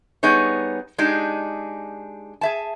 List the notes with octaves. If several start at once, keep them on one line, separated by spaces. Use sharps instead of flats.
G3 B3 D#4 G#4 C#5
G#3 D4 D#4 G4 G#4
G#4 E5 A5